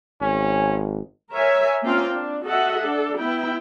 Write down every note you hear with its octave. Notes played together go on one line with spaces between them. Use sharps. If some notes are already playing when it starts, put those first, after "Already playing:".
G#1 C#4
A#4 C#5 E5 G#5
A#3 C4 C#4 F4 F5 G5
D4
F#4 A4 D#5 E5 F#5
D4 A4
B3 E4 G5